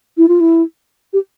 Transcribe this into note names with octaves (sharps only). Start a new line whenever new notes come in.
E4
F4
E4
G4